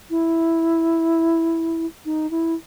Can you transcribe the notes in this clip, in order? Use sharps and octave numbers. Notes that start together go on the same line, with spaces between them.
E4
D#4
E4